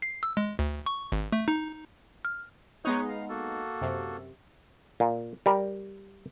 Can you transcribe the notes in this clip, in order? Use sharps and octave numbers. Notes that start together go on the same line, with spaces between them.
C7
E6
G#3
D2
C#6
G#1
A3
D#4
F6
G#3 B3 D#4 B4 C#5 C#6
F5 A#5
A#3 F#4 A4
F#2 C3
A#2
G3 A#4